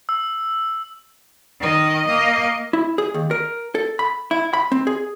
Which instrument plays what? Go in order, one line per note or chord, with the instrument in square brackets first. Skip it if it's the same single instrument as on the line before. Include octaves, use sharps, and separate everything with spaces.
[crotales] E6
[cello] D#3 D#5
A#3 D#5
[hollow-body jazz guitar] E4
G#4
D#2
A#4
A4
B5
E4
B5
C4
G#4